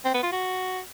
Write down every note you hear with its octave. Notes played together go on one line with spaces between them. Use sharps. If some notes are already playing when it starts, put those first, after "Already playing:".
C4
B3
F4
F#4